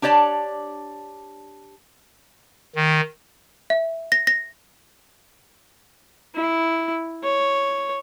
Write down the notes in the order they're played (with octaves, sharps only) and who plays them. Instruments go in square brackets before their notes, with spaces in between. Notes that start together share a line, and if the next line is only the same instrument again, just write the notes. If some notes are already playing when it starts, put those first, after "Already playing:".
[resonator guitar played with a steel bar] D4 G4 C#5 D5 A5
[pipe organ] D#3
[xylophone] E5
A#6
A#6
[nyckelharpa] E4
C#5